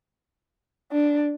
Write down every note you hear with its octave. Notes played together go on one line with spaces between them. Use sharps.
D4